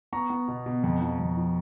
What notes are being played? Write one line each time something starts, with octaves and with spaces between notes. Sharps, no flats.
B3 A#5 C#6
B3
B2
B2
F2
F3
F2
F3